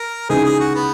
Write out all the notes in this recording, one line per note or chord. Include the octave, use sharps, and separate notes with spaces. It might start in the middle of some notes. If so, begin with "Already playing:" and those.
Already playing: A#4
C#3 E3 G#3 D#4 G#4
G#4
F#4
B3